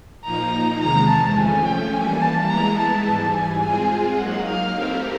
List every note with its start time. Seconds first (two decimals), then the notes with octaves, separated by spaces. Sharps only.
0.24 A#2 F3 A#3 D#4 A#5
0.80 E2 C3 D#3 G#3 A#5
1.09 A5
1.37 F3 A3 C#4 G#5
1.65 G5
1.93 E3 G3 A#3 G#5
2.21 A5
2.49 E3 G#3 B3 E4 A#5
2.78 A5
3.06 G#2 E3 G3
3.34 G#5
3.63 G#3 C4 F4 G#4
4.18 F#3 A#3 D#4 F#5
4.47 F5
4.75 A3 C4 E4 G4 A#4